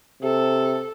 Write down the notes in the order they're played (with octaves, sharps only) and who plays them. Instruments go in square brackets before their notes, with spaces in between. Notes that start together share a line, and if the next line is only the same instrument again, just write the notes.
[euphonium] C3 [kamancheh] A4